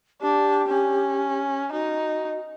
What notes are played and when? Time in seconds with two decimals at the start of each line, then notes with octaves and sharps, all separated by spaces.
0.21 D4 G4
0.68 C#4
1.72 D#4 F#4